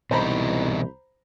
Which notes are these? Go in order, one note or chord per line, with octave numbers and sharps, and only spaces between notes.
C2 B2 E3 D#4 C5 A#5 B5